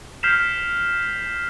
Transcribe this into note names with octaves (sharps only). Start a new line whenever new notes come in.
F6 G6 B6 C7 E7 F7